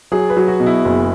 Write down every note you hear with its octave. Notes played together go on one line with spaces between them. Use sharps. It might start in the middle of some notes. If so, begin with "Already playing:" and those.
F#3 G#4
B4
F#3
F#4
B2
E4
F#1